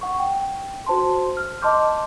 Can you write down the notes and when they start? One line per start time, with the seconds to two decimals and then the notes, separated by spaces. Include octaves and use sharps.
0.01 F#5 C#6
0.19 G5
0.87 F#4 C5 A5 C6
1.37 F6
1.62 D#5 A5 C6 D6 G6